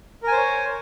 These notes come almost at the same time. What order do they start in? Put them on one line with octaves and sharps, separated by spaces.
A#4 G#5 C5 C#5